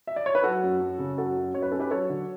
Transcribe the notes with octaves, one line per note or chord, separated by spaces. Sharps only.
E5
D5
C#5
B4
F#3 F#4 A4
F#2
F#2
C#3
F#2 F#4 A4
F#2
F#2 C#5
B4
C#4 A4
G4 B4
F#3 A4 C#5
D3